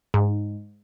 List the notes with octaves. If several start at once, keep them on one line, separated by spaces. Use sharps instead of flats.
G#2